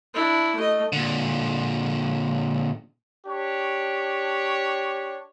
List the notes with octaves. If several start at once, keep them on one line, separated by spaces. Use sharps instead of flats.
D4 E4
A3 D#5
A#2 D3
D4 G4 C#5